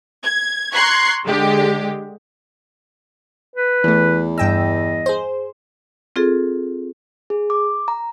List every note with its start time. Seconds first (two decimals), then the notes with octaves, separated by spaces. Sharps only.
0.24 G#6
0.73 A#5 C6 C#6 F#6 G#6 C7
1.25 D3 G#3 G4
3.56 B4
3.84 E2 E3 A3
4.38 G2 D#5 G5 E6
5.06 G#4 C5
6.16 C4 F4 G#4 A4
7.30 G#4
7.50 D6
7.88 A#5